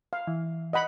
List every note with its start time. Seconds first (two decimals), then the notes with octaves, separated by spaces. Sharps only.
0.13 F5
0.27 E3
0.73 D#5 F#5 B5